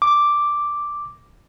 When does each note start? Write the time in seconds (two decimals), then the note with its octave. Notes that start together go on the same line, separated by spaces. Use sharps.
0.02 D6